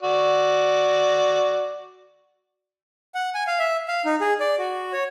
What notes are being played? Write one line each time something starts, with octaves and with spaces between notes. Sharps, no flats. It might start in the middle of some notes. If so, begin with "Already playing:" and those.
F#4 D5
F#5
G#5
F5
E5
F5
D#4
G#4
D5
F#4
C#5